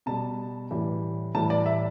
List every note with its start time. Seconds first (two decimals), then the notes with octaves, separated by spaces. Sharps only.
0.06 B2 G3 A5
0.71 A2 E3 G3
1.35 A2 E3 G3 A5
1.50 D5
1.66 E5